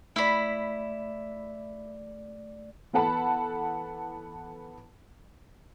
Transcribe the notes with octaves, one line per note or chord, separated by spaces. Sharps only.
A3 E4 D5 B5
E3 B3 A4 F#5 A5 B5